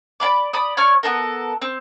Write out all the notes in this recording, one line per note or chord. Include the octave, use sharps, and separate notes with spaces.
D5 F5 B5 D6
D5 B5 D#6
C#5 D5 C#6 F6
B3 G4 A4 A#4
C4